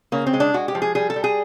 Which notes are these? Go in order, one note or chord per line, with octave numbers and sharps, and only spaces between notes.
C#3 A#3
C4
G#3
D4
G#3 F#4
G4
F3
G#4
G3 G#4
A4
G3
G#4